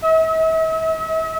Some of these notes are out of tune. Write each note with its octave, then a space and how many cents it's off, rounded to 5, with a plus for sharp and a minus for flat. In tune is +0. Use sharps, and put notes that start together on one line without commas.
E5 -45